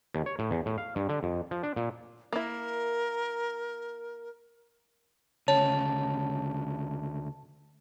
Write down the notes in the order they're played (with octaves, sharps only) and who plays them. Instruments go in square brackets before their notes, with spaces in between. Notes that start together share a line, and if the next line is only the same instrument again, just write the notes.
[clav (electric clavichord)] D#2
C#5
A2
E2
A2
F5
G2
D3
F2
F3
D4
A#2
[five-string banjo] A#3 E4 [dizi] A#4
[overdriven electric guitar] D2 C#3 [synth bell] C#5 [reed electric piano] A5